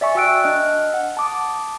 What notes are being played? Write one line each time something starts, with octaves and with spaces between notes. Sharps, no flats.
D5 E5 G#5 C#6
F#4 E5 G5 E6 F#6 D7
D4 D#5 F6 F#6
F#5
A5 D6 D#6